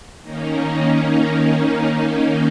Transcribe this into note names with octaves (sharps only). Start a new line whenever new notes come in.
D#3 A#3 C#4 D#4
C#4
D#4
D#3 A#3 C#4